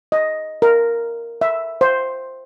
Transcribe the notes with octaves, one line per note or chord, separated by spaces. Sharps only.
D#5
A#4
E5
C5